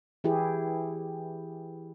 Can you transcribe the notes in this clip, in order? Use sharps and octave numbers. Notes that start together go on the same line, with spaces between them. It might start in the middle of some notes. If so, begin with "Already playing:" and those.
E3 E4 G4 G#4